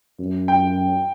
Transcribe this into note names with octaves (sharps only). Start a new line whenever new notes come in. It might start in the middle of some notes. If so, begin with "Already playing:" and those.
F#2
G5